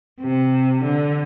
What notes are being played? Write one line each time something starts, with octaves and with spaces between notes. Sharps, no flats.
C3
D3